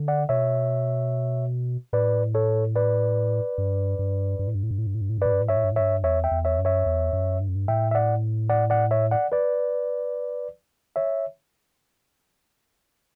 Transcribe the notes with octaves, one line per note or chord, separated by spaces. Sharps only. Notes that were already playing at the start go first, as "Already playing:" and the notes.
Already playing: D3
D5 F#5
B2 C#5 E5
A2 B4 D5
A4 C#5
B4 D5
G2
G2
G2
A2
G2
A2
G2
A2
G2
A2
G2
A2
G2
A2 B4 D5
G2
A2
G2 C#5 E5
A2
G2
A2
G2 C#5 E5
E2 C#5 E5
E5 G5
E2
C#5 E5
F#2
C#5 E5
E2
F#2
G2
F#2
G2
A2 E5 G5
E5
D5 F#5
D5 F#5
D5 F#5
C#5 E5
D5 F#5
B4 D5
C#5 E5